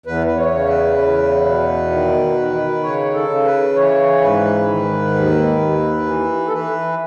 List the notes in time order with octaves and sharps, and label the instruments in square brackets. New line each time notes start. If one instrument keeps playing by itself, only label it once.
[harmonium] E2 B4
B4
C#5
C#3
B4
E2
B2
D#3
D#3
C#3 C#5
A4
C#3
B4
E3 C#5
G#2 B4
D#3
D#2
D#2
E3
A4
E3 B4